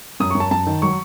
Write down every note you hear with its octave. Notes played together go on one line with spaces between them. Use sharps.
F#2 D#6
F#2 C#6
A5
F#2 A5
D#3
F#3 C#6